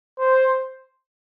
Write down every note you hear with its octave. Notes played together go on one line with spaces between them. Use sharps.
C5